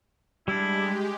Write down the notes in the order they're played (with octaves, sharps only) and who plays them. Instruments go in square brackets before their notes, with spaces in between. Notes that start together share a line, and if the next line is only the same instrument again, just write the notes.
[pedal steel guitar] G3 D4 [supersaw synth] G#3 G4 [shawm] E4